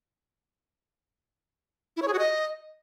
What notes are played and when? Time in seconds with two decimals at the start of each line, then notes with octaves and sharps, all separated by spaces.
1.97 E4
2.02 C#5
2.08 G#4
2.13 F#4
2.19 D#5